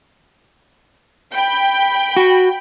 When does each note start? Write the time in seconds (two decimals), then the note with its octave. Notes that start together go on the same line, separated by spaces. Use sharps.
1.34 G5 B5
2.17 F#4